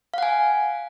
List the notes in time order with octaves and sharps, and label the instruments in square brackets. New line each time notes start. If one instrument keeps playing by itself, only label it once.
[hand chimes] F5
F#5
G#5